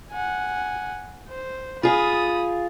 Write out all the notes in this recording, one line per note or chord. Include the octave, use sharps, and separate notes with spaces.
F#5 G#5
C5
F4 G#4 B5 D#6